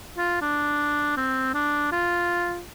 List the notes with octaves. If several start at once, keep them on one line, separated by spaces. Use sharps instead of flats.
F4
D4
C4
D4
F4